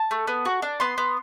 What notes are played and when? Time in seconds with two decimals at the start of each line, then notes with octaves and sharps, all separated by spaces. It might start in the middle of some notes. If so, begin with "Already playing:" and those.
Already playing: A5
0.11 A3
0.27 B3
0.45 F#4
0.62 D4
0.80 B3 C6
0.98 B3